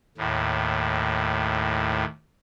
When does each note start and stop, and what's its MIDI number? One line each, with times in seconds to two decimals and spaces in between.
0.18 2.05 39
0.18 2.05 45